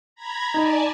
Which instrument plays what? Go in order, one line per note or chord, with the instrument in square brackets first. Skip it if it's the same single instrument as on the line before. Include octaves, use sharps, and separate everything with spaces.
[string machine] A#5 B5 G#6
[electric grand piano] D#4 [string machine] D5 G#5 A5